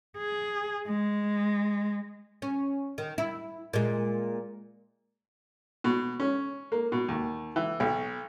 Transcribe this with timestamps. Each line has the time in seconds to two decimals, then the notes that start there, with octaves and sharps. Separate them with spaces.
0.17 G#4
0.87 G#3
2.42 C#4
2.98 D#3
3.18 E4
3.73 A#2 G#3
5.84 B2
6.20 C#4
6.72 A#3
6.92 B2
7.08 D#2
7.56 E3
7.80 B1